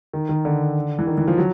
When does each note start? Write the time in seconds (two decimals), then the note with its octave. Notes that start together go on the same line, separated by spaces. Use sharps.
0.13 D#3
0.29 D#3
0.45 D3
0.99 E3
1.07 D#3
1.18 E3
1.28 F3
1.38 F#3